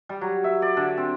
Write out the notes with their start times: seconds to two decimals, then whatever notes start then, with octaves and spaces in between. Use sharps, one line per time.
0.09 G3
0.21 F#3
0.44 E5
0.62 D5
0.77 D3
0.97 C4